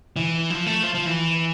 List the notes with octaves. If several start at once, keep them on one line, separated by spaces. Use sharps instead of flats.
E3
F3
A3
F3
F3
E3